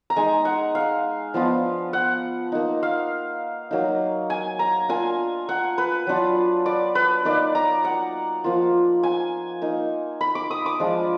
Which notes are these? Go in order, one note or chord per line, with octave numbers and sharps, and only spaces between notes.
A#5
G#3 D#4 G#5
F#5
F5
F3 B3 D4 F4
F#5
A#3 D#4
F5
F#3 A#3 D#4
G#5
A#5
A#3 D4 F4 G#5
F#5
B4
F#3 D4 F4
D5
B4
A#3 D#4 D5
A#5
F#5
F3 A#3 F4
G#5
A#3 D#4
B5
D6
D#6
D6
F3 G#3 D4 F4